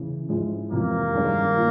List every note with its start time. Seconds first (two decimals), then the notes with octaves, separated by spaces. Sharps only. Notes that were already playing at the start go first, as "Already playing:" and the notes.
Already playing: C#3 E3
0.29 G#2 F3 G#3 C#4 E4
0.71 F2 C3 E3 A#3
1.13 G2 D#3 G#3 C#4
1.56 A#2